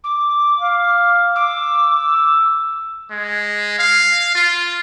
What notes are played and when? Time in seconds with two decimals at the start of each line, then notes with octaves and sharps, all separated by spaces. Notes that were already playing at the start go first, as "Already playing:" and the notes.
0.04 D6
0.59 F5
1.36 D6 E6
3.11 G#3
3.79 F5
4.35 F4